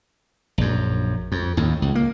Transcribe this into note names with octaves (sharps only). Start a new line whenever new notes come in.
A#1 F#2
F2
D#2 A2
C#2
A#3